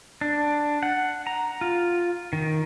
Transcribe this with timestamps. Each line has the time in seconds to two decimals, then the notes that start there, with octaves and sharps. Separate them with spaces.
0.21 D4
0.83 F#5
1.27 A#5
1.61 F4
2.33 D#3